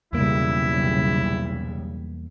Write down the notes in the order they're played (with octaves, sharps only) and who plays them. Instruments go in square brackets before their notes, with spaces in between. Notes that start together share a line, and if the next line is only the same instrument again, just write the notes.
[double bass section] B1 C#3 G3 [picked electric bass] E2 A#3 [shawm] E4